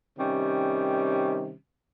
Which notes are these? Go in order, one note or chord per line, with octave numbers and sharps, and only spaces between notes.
C3 D#3 G3 C#4